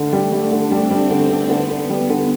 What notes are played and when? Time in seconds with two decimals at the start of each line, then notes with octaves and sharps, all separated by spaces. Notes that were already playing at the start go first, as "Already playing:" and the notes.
Already playing: D3 A3
0.13 G3
0.32 G3 D4
0.52 D3
0.71 G3 C4
0.91 G3
1.10 D3 B3
1.30 D3
1.50 D3 B3
1.70 D3
1.90 G3
2.09 D3